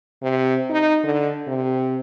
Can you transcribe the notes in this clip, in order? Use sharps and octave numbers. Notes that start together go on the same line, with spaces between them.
C3
D#4
D3
C3